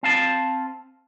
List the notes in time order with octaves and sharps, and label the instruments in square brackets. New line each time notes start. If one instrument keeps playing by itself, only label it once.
[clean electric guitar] C4 F5 A5